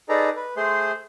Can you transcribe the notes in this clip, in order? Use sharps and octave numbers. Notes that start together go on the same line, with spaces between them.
D#4 G#4 A4 B4 D5 A#5
B4
A3 G#4 C5 C6